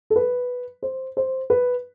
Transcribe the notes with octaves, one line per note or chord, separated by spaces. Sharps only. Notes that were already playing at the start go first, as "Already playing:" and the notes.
A4
B4
C5
C5
B4